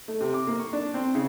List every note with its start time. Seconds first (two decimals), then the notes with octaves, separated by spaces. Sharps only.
0.08 A3
0.20 C3
0.34 D6
0.47 A#3
0.60 C#6
0.73 D4
0.94 C4
1.15 C#3